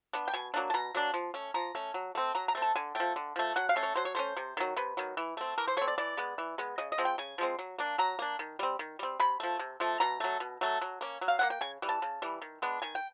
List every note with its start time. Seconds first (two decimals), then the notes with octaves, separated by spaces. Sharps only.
0.13 B3 D4
0.28 G5
0.33 B2 G#5
0.54 F#3 A#3 D4
0.70 A5
0.74 B2 A#5
0.95 F#3 A#3 D4
1.14 F3
1.34 A3 C#4
1.54 F3 A#5
1.75 A3 C#4
1.94 F#3
2.15 A3 C4
2.35 F#3 A#5
2.48 A#5
2.55 A3 C4
2.62 A5
2.76 D3 G#5
2.95 F3 A3 G5
3.16 D3
3.36 F3 A3
3.56 F#3 F#5
3.69 F5
3.76 A3 C#4
3.83 C#5
3.96 F#3 C5
4.05 C#5
4.15 A3 C#4 C5
4.37 C3
4.57 D#3 F#3
4.77 C3 B4
4.97 D#3 F#3
5.17 E3
5.37 A3 C4
5.58 E3 A#4
5.67 C5
5.77 A3 C#5
5.81 C4
5.88 D5
5.98 E3 D5
6.17 G#3 B3
6.38 E3
6.58 G#3 B3
6.78 C#3 D#5
6.92 D#5
6.98 F3 G#3 C4
7.05 G5
7.18 C#3 G#5
7.38 F3 G#3 C4
7.59 F#3
7.78 A#3 D4
7.98 F#3 A#5
8.19 A#3 D4
8.39 D#3
8.59 G3 C4
8.79 D#3
8.99 G3 C4
9.20 C3 B5
9.40 F3 A3
9.59 C3
9.80 F3 A3
10.00 B2 A#5
10.20 F#3 A3
10.40 B2
10.61 F#3 A3
10.81 F#3
11.01 A#3 C#4
11.21 F#3
11.28 F5
11.39 A#3 C#4 F#5
11.50 G5
11.61 C#3 G#5
11.82 E3 G3
11.89 A5
12.02 C#3
12.22 E3 G3
12.42 D#3
12.62 G#3 B3 D4
12.82 D#3 G#5
12.95 G5